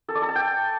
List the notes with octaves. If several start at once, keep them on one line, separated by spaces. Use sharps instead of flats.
A4
D5
A4
A5
G5